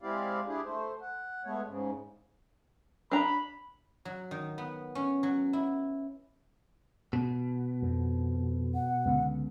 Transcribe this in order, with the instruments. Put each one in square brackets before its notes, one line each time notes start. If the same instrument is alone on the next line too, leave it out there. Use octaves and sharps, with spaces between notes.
[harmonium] G#3 C4 E4 G4 D5 F5
D4 E4 G4 G#4
A3 C5
F#5
G#3 A3 B3 C#5
G#2 C#3
[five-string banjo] D4 A#5 [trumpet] B5
[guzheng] F#3
D#3
B3
C#4
F#3
E4
[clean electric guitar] B2
[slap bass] F2
[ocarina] F#5
[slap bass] C#2 D3 B3